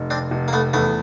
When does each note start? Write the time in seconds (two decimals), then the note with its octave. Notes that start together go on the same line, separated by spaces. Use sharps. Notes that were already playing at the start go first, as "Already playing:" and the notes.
Already playing: F1
0.10 C4 D4
0.31 F1
0.48 A#3
0.53 A3 B3
0.73 E2 A3 B3